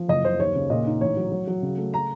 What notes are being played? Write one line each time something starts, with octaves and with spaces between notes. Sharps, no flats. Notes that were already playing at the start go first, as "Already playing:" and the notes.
Already playing: F3
F#1 D#5
F#1 C5
D#2 C#5
C#3
A#2 D#5
D#4
A1 C#5
F#3
F#3
F#3
C#3
A3
A#5